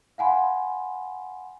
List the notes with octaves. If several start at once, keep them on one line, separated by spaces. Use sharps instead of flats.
F5 F#5 G#5 B5 C6